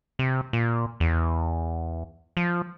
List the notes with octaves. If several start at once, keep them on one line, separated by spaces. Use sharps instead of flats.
C3
A#2
E2
F3